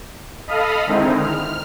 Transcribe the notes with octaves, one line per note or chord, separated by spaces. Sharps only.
A4 D#5 F5 B5 D#6 F6
D3 D#3 G#3 C4 D#4 E4
F6